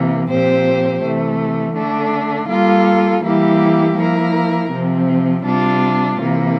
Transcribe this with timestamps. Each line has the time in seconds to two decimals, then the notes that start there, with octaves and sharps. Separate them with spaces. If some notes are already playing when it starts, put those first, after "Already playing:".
Already playing: C3 E3 A#3
0.29 A#2 F3 C4 G4 C5
1.02 C3 E3 A3
1.76 D3 A3 D4
2.49 G3 A#3 F4 A4
3.23 E3 G3 A#3 E4 G4
3.97 F3 A#3 E4 A#4
4.71 C3 F3 C4
5.45 C3 G3 D4 F4
6.19 C3 E3 A#3